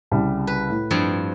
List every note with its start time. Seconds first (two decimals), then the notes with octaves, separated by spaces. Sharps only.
0.11 C2 C#3 G3
0.47 B4
0.70 A2
0.91 G2 F3 C4